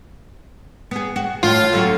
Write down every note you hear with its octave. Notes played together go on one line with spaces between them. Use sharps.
B3 G#4
F#4
A2 F4
D3 F#3 F#4